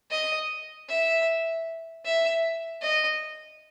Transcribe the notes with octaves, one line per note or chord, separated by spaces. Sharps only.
D#5
E5
E5
D#5